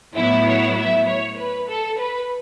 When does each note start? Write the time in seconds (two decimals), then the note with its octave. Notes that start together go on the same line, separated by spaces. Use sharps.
0.16 A2 F#3 B3 E4 E5
0.46 C#5
0.77 E5
1.07 C#5
1.38 B4
1.68 A4
1.98 B4